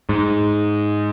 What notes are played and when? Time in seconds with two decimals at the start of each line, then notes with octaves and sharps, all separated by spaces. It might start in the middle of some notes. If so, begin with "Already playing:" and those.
0.09 G#2